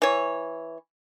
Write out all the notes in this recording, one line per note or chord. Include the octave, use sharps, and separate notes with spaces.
E3 C#5